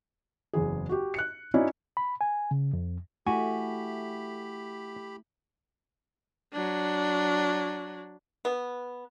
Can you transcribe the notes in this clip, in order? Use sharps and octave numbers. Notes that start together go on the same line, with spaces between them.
F#1 E2 G#4
F#4 G4
F#6 C#7
C#4 D#4 E4 F#4 D5
B5
G#5
C#3
F2
A3 E4 F#4 G4 G#5 B5
F#3 D4
B3